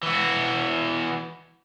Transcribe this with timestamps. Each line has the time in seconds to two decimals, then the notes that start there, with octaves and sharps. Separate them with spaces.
0.03 E3 F#4